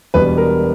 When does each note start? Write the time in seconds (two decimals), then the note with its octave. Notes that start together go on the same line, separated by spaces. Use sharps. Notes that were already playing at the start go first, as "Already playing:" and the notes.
0.14 E1 E2 B2 G3 B4
0.38 A#4